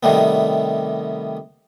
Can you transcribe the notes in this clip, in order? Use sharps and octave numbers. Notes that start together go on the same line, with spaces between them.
C3 D#3 G3 A3 B3